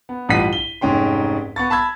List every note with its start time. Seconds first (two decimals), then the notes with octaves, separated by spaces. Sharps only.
0.09 B3
0.29 A1 G2 F4 F#5 B6 D#7
0.53 G7
0.81 F1 G#2 C#4 G5 C6
1.56 B3 C#6 A6
1.70 A5 B5 E6 G#6